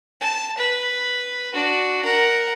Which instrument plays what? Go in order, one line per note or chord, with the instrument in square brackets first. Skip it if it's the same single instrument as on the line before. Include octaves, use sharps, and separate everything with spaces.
[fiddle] A5
B4
D4 F#4
A#4 F#5